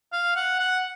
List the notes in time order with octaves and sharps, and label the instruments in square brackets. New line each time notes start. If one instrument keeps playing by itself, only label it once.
[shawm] F5
F#5
F#5